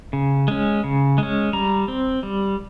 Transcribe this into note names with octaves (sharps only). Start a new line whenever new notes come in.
C#3
G#3 C#4
C#3
G#3 C#4
G3 A#5
C4
G3